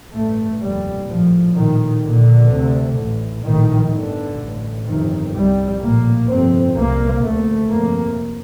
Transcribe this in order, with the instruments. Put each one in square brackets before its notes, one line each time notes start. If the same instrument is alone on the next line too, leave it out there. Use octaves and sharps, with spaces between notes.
[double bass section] A1 G2 A3
F1 D#2 G3
A#1 A2 F3
A#1 A2 D#3
A#1 A#2 D3
D2 C3
A1 A2
A#1 A2 D#3
G1 G2 D3
A1 A2
G1 F2 C3 D#3
C2 C3 G3
A#1 A2 A#3
G1 F2 C3 C4
C2 C3 A#3
D2 C3 A3
G1 F2 C3 A#3